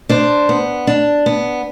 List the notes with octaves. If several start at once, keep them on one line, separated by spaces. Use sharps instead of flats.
D4 C5
B3
D4
B3